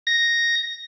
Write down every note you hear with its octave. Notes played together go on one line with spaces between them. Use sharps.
A#6